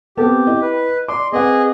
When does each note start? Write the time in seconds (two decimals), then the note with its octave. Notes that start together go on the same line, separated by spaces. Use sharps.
0.17 B3 C4 G4 A4
0.47 E4 D#5
0.62 B4
1.08 D5 C6 D6
1.32 C4 G#4 B4 D#5 F#5